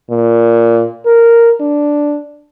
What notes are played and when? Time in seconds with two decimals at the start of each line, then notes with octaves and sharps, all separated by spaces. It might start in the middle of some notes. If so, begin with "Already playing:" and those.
0.10 A#2
1.06 A#4
1.61 D4